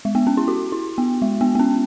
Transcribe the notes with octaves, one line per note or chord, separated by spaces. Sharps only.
G#3
B3
C#4
E4
F#4
E4
B3
G#3
B3
B3
C#4